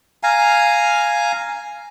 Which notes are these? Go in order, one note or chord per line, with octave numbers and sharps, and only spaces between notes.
F5 G#5 A#5